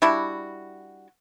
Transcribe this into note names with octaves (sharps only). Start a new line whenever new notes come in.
G3 D4 E4 F#4